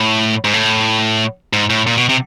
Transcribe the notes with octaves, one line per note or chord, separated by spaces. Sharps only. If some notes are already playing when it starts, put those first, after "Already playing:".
Already playing: A2
G#2
A2
G#2
A2
A#2
B2
C3